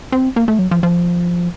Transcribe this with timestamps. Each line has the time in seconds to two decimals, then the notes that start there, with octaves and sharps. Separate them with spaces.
0.12 C4
0.36 A#3
0.48 A3
0.59 F#3
0.71 F3
0.83 F3